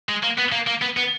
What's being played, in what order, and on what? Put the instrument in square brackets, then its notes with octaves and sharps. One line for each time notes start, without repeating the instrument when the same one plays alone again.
[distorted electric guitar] G#3
A#3
B3
A#3
A#3
B3
B3